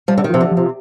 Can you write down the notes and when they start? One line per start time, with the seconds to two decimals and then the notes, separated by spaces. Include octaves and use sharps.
0.08 F3 G3
0.18 D3
0.24 D#3
0.30 C3 F3
0.41 D3
0.52 F3
0.57 C3